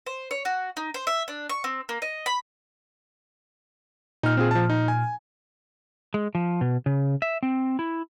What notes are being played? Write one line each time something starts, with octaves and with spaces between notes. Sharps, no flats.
C5
C#5
F#4
D#4
C5
E5
D4
C#6
C4
A#3
D#5
B5
A#2 D#4 F6
C4 F4 G#4
F3 A5
D#4
G#5
G#3
F3
B2
C#3
E5
C4
E4